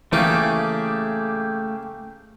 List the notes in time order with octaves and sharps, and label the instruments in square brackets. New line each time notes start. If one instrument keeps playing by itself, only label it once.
[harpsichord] C#3 A#3 D6 [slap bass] E3 [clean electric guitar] A3 G4 G#4